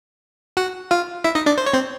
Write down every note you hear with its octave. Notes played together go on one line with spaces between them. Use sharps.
F#4 F#5
F4 F5
E4 E5
D#4 D#5
D4 D5
C5
C#5
C4 C5